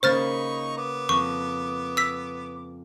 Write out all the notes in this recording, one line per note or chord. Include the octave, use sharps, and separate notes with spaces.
C#3 A#3 D#4 C5 B5 C#6 F6 A6
B3 D6
F2 C#6
E6 B6